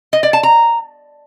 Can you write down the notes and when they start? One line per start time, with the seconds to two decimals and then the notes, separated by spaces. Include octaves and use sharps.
0.13 D#5
0.23 D5
0.33 A5
0.43 A#5